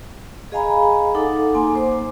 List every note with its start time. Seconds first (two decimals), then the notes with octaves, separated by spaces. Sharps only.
0.52 G#4 D#5 F5 G#5 A#5 B5
1.15 D#4 A4 F#5 D6
1.54 A#3 G#5 C6
1.75 C5 D6